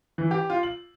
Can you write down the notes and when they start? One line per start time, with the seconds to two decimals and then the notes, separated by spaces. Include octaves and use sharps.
0.18 E3
0.31 G4
0.50 F4
0.63 F#7